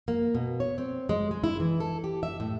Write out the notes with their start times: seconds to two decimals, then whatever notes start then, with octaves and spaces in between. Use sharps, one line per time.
0.08 A#3
0.35 B2
0.60 C#5
0.78 C4
1.09 G#3
1.31 G#3
1.44 E4
1.60 E3
1.80 A4
2.04 G4
2.23 E5
2.40 A2